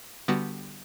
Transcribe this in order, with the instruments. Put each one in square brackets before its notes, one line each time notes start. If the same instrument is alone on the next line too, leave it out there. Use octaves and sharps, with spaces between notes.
[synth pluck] D3 G3 B3 F#4